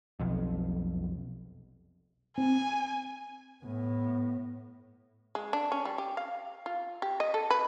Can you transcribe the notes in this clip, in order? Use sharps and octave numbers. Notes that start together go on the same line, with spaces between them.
F1 B1 F2
C4 G#5
A2 B3
G#3
D4
C#4
G3
G4
F5
F4
G4
D#5
A4
B4